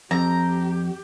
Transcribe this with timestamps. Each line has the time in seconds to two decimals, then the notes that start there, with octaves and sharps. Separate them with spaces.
0.11 F2 G4 A#5